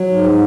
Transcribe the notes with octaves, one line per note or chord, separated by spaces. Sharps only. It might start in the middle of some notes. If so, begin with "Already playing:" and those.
Already playing: F#3
G#2